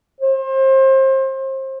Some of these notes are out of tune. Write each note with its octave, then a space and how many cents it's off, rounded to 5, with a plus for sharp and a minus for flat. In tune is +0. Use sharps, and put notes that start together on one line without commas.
C5 +30